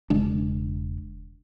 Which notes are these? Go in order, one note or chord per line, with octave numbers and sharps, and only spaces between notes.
E1 C#3 G#3 D4